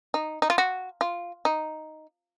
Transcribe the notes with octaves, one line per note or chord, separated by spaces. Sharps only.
D#4
D#4
F4
F#4
F4
D#4